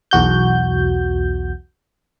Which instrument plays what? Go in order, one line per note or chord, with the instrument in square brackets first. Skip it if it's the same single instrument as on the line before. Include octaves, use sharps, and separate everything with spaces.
[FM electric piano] B1 E2 F#4 G6